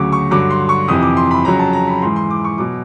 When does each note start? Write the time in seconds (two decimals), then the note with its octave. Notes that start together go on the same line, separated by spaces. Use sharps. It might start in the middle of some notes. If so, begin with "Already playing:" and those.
Already playing: D2 C#3 F#3 C#6 D6
0.12 C#6
0.31 G2 D3 F#3 D6
0.50 C6
0.69 C#6
0.88 F2 C3 E3 D#6
1.03 D6
1.17 C6
1.31 B5
1.45 F2 C#3 F#3 A#5
1.59 A5
1.73 A#5
1.88 B5
2.02 G#2 E3 C6
2.16 C6
2.30 D6
2.44 C#6
2.58 B2 F#3 D6